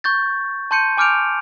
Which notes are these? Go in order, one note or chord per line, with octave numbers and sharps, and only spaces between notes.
C#6 G6 A6
A5 C6 G6 C#7 D#7
G#5 D6 F6 G6 D7 F7